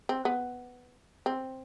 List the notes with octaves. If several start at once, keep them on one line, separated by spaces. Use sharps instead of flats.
C4
B3
C4